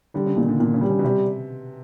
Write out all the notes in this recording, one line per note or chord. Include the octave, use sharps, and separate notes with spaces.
D3 G3
C#3
A#2 D#3
D3
A#2 D#3
C#3
G3
C#3
B2
C3 G3